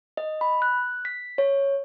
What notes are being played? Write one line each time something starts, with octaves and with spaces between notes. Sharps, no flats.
D#5
B5
F#6
B6
C#5